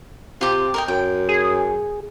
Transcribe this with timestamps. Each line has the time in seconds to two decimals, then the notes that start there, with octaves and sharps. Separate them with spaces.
0.41 C3 F4 G4
0.74 A#4 D#5 G5
0.88 F#2 G5
1.29 G#4